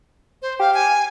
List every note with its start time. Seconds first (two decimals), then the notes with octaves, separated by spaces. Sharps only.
0.42 C5
0.60 G4 F5
0.74 G#5